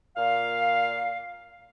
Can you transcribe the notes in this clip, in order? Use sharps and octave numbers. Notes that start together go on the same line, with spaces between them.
A#2 F5